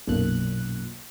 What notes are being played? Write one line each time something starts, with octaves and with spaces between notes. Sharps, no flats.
B1 F#2 A#2 F#6